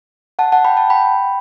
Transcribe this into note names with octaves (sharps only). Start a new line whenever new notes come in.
F#5 A5
F#5 A5
G5 B5
F#5 A5
G5 B5